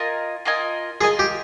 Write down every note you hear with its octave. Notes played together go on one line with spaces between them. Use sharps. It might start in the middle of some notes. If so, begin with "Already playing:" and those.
Already playing: F4 A#4 D#5 G#5
F4 A#4 D#5 G#5
F4 G#4 A#4 D#5 G#5
G4